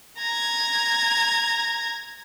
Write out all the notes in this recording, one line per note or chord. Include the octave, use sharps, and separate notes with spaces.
A#5 G#6